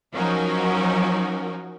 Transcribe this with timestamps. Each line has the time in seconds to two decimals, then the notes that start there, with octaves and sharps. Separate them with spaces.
0.13 F3 F#3 C#4 D#4 F#4 A#4